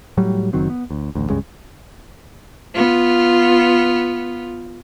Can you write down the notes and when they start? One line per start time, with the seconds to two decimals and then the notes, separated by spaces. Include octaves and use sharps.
0.17 A2 F#3 G3
0.53 F#1 D#3 F#3 C4
0.70 B3
0.91 D2
1.15 A1 D2
1.30 C#2 G2 C#3 G#3
2.74 B3 F4